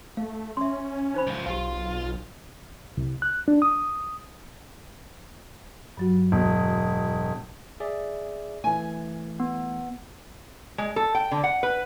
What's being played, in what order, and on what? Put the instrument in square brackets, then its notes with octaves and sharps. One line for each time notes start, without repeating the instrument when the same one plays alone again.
[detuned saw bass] A3 [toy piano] F5
[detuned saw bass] C#4 [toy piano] E5 C6
[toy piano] D#4 C5 B5
[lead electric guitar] C#2 F3
[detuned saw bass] B1 [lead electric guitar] F4 [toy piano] G4 F#5 G#5
[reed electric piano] C2
F#6
D4
D#6
[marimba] G2 F#3 F#4
[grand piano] E1
[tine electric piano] G#4 D5 E5
[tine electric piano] E3 A3 [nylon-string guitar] G#5
[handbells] B3
[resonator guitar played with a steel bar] G#3
A4
G5
D3
F#5
B4